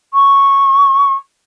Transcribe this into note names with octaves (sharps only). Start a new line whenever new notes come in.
C#6